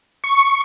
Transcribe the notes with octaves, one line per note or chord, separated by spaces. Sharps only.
C#6